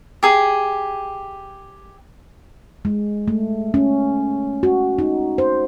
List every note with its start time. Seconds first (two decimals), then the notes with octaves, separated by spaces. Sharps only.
0.23 G4 G#4
2.85 G#3
3.28 A3
3.74 C#4
4.63 F#4
4.99 D#4
5.38 C5